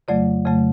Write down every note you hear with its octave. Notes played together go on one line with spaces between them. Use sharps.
F2 C#3 F#3 A3 D5
F2 C#3 F#3 A3